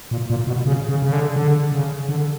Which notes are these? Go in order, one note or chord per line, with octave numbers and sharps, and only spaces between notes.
A#2
A#2
B2
C#3
C#3
C#3
D3
D3
C#3
D3